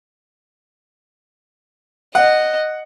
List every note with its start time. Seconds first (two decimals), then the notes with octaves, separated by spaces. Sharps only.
2.15 D#5 F#5